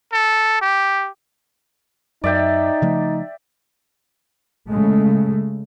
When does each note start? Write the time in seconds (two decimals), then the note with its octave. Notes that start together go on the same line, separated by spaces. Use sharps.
0.13 A4
0.62 G4
2.24 F#2 D#4 D5 E5 G5
2.82 C#3 F3 A3
4.69 C#3 G#3 A3